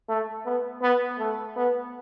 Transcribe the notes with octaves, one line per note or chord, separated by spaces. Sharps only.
A3
B3
B3
A3
B3